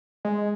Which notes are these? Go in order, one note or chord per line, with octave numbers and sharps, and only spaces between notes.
G#3